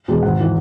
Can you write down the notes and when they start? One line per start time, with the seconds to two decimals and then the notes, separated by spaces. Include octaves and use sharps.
0.08 E2 B2 G#3
0.22 G#1 F#5
0.40 E3